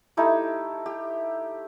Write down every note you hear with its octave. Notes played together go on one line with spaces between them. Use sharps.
A3 D#4 E4 G4
G4